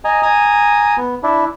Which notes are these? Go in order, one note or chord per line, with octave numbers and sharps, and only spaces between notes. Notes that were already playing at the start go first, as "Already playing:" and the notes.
D#5 G#5 A#5
G#5 A#5 D#6
B3
D4 E4